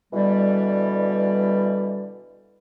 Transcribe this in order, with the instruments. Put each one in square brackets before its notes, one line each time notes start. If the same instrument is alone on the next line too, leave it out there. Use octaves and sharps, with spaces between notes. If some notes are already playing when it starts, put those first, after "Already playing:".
[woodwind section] B2 D3 E3 G3